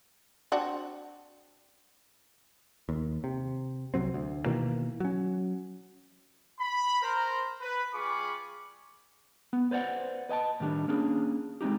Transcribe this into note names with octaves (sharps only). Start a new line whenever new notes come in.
C4 D4 F#4
D#2
C3
C2 C3 F#3 C4
D2
B2 D#3 E3 A#3
F#3 C#4
B5
A#4 C5 A#5
B4
G3 F4 G#4 B5 C#6 D6
B3
B4 C5 D5 F5 F#5
B4 D#5 G#5 A5
A2 D#3 G3 D4
A#3 C#4 D4 G#4
G#3 C4 C#4 D#4 G4